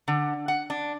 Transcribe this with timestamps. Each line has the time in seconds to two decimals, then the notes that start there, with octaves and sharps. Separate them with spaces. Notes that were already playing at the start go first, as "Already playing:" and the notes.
0.08 D3
0.48 F#5
0.70 D4